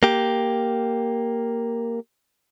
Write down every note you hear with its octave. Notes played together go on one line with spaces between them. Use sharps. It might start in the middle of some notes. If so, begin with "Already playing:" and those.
A#3 G4